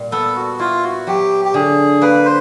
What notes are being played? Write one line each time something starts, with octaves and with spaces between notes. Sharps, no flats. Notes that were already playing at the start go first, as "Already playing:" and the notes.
Already playing: A#2 G3
B3 A4
F#4
E4 F4
F#4
F#3 G4
G4
D3 G#4
A#3 B4
C5